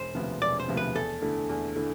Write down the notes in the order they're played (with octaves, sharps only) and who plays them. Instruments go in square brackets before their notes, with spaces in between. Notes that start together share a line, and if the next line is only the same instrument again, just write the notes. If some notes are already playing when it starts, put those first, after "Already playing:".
Already playing: [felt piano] E1 [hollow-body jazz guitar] C5
[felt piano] D2 C3 F3 B3
[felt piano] E1 [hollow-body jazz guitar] D5
[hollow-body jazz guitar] C5
[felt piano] D2 C3 F3 B3
[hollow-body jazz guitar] B4
[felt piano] E2 [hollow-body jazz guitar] A4
[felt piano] D3 A3 E4
E2
D3 A3 E4